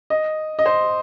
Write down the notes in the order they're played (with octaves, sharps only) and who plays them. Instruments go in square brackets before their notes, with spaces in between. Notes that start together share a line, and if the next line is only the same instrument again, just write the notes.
[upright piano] D#5
D#5
C5